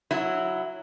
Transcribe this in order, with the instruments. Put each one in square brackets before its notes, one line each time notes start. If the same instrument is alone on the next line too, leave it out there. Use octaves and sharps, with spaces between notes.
[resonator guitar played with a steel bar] F#3 E4